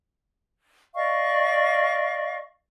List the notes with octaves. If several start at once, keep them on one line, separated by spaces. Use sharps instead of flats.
D5 D#5 F5 C#6